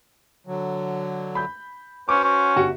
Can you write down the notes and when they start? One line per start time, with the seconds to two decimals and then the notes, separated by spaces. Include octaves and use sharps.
0.47 D3 F#3
1.35 B5 G6
2.09 C#4 F#4 B4 C5 D6
2.23 C#4
2.56 G1 F#4 G4